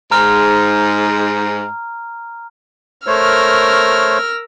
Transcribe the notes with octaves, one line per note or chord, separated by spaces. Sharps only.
G#2 A#5 F6
A3 A#4 C5 C#5 E6 F6